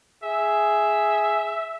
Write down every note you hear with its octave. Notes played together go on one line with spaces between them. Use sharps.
G#4 E5